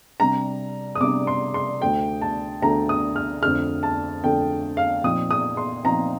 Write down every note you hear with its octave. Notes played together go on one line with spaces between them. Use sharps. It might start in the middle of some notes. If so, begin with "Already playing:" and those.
C3 G3 D4 A#5
D#6
C3 G3 D4 D6
C6
C6
D2 D3 A3 G5
A5
D2 D3 A3 A#5
D#6
F6
F2 D3 A3 F6
A5
F2 D3 A3 G5
F5
A#2 F3 C4 D#4 D#6
D#6
C6
A#2 F3 C4 D#4 A#5